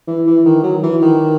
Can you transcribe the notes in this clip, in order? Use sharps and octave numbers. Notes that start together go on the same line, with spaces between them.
E3
E3
D#3
F#3
E3
D#3